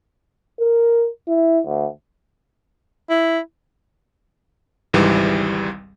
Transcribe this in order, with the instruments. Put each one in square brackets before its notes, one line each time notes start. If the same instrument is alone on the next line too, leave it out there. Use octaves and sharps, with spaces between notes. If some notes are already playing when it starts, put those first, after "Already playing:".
[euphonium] A#4
E4
D2
[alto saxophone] E4
[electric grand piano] G#1 C#2 G#2 E3 G3